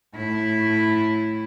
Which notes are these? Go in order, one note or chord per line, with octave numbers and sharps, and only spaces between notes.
A2 E4